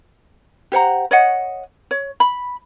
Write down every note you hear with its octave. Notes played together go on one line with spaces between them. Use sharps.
G4 C5 F#5 A#5
C#5 D#5 F#5
C#5
B5